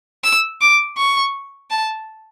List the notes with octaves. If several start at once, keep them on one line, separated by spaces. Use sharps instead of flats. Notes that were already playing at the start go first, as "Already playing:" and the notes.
E6
D6
C#6
A5